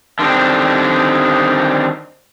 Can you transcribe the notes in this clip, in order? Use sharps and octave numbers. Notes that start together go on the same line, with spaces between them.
D3 D#3 G3 C4 D4